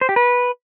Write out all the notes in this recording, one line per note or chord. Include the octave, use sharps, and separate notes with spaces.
C5
G4
B4